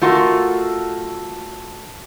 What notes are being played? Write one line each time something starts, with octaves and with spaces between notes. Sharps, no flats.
A3 F4 F#4 A4 A#4